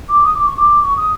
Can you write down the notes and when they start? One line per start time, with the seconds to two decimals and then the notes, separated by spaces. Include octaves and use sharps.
0.09 D6
0.24 D#6
0.35 D6
0.46 C#6
0.57 D6
0.82 C#6
0.97 D#6